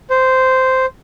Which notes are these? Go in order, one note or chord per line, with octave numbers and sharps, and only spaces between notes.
C5